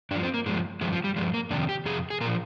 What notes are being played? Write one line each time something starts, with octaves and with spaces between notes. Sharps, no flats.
G2 F3 D4
C4
A#3
G2 F3 G#3
G2 F3 G#3
F3
G3
G2 F3 G#3
A#3
F2 C3 D#3 D4
G4
F2 C3 G#4
G#4
A#2 F3 A#4